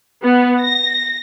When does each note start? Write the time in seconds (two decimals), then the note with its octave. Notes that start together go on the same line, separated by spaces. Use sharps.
0.23 B3
0.61 A#6